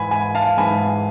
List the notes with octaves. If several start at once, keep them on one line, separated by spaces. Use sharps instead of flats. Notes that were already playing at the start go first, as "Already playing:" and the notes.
Already playing: G#2 E3 G#3 G#5 B5
G#5 B5
F5 A5
G#2 E3 G#3 G#5 B5